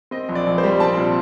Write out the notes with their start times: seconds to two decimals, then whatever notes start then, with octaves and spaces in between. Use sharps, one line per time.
0.11 C4 D#5
0.29 A#1
0.35 D5
0.46 A#1
0.58 C5
0.63 G3
0.80 C4 A5
0.97 A#2